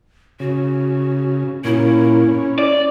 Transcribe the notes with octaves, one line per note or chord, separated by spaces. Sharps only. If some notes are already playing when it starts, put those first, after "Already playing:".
C#3 F#4
A#2 C#4 E4
C#4
D5